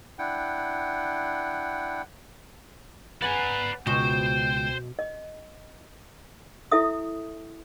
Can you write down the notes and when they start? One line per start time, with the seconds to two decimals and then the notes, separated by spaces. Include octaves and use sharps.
0.19 D4 E4 F#5 G5
3.22 B4 D5 F#5 G#5 A#5
3.87 C#2 B2 C5 G5
4.99 D#5
6.72 E4 A4 E5 D#6